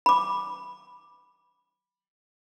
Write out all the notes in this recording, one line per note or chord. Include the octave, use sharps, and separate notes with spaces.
B5 D6